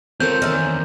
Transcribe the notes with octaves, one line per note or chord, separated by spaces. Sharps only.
C4 F4 A4 A#4 C#5 G6
E2 D#3 C#4 A#4 D5 E5